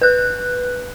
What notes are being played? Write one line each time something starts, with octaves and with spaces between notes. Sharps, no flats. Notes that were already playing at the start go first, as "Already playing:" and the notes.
B4 F#6